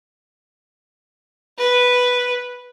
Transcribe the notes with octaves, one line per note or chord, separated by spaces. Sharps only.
B4